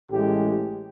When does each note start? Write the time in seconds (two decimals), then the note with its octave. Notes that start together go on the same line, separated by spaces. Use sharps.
0.10 A1 A2 E3 G#3 G4